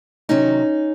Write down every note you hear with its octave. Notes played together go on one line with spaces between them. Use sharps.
C3 D#3 F#3 C#4 D#4